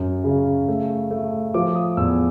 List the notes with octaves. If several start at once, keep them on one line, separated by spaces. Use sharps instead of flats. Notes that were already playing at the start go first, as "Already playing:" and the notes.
Already playing: F#2
C#3
A3
A3
F3 D6
D#6
E2 E6